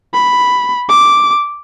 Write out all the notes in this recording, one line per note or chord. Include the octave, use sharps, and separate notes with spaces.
B5
D6